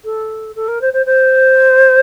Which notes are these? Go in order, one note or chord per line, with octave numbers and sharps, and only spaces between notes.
A4
A4
A#4
C5
C5
C5